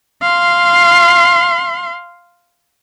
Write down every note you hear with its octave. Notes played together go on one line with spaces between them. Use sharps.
F5 C6